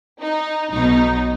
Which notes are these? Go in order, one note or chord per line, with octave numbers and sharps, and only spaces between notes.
D#4
B1 B2 F#3 D#4